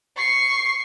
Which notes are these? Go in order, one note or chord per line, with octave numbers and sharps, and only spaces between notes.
C#6 C7